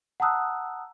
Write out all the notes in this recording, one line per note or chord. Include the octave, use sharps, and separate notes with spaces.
F#5 A5 A#5 D#6 E6 F#6